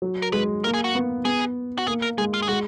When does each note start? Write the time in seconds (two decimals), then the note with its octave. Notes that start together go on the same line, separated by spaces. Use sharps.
0.02 F#3
0.22 A#4
0.33 G#3 B4
0.64 A#3 A#4
0.74 G#4
0.84 F#4
0.95 B3
1.25 B3 G#4
1.78 F#4
1.87 A#3 G#4
2.02 A#4
2.18 G#3 G#4
2.34 F4
2.43 G#4
2.49 G#3 F#4